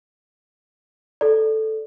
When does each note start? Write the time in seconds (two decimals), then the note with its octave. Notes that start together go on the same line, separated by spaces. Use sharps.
1.21 A4 D5